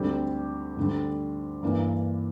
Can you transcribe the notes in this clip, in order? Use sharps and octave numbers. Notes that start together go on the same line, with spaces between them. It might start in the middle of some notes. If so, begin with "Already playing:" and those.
Already playing: D2 D3 G3 C4 G4
D2 D3 G3
G2 E3 A#3 D4